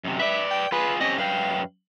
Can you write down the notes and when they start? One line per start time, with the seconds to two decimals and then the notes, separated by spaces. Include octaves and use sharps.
0.04 F#2 C3
0.19 B4 D5 E5
0.50 G5
0.72 F4 G#4 B4
1.01 C4 C#4 G4 D#5
1.18 F#2 B4 F5 G5